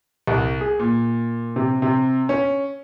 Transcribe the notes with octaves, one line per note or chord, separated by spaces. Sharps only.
C2
G#4
A#2
C3
C3
C#4